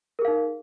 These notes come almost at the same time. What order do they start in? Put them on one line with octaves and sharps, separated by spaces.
A#4 G#4 F5 D#4